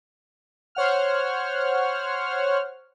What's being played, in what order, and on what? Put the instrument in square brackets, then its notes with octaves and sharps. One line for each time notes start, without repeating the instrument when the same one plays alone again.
[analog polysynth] C5 C#5 F#5 F6